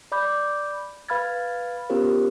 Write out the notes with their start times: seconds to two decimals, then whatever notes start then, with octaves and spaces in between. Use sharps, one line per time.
0.12 D5 B5 D6 G6
1.09 B4 F5 B5 F6 G#6 A6
1.90 B3 C#4 F4 G4 A#4 C5